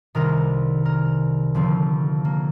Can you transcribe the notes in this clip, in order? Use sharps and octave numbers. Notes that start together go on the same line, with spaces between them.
C2 C3 D#3 A#4
A#4
F1 F2 D3 F3 C4
A#3